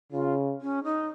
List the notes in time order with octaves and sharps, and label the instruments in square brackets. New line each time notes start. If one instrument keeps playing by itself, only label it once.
[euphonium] C#3 [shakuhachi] F4
[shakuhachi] C#4
D#4